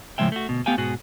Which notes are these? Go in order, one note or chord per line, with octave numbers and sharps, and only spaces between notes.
A2 C#3 F3 G#3 E5 G5
A3 F#4
D2 B2
A3 B3 G4 F5 G5 G#5
G#2 B2 F#4 G#4